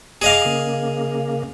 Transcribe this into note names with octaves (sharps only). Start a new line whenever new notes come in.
G#4 D#5 F5 A#5 D6
C#3 A#3